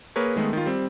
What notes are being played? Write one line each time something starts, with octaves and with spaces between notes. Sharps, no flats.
A#3 G#4 A#4 B4 C#5
D#3 G#3 A3 B3
D#3 F4
G3 C4